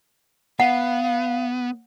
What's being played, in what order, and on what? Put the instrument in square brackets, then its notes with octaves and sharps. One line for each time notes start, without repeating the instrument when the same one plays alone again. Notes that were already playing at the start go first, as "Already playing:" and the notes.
[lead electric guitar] B3 [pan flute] F5 [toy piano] F#5